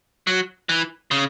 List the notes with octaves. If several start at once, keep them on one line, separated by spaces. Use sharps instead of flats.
F#3
E3
C#3